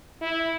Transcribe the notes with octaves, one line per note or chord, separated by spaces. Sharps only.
E4